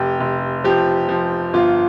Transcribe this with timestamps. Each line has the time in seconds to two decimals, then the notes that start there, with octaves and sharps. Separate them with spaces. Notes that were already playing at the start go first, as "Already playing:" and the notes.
Already playing: F1 G4
0.20 F1
0.64 F3 G4
1.09 F3
1.53 G1 F4